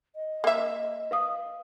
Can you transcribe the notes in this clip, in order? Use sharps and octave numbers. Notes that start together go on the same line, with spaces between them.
D#5
A#3 E5
B4 F5 D#6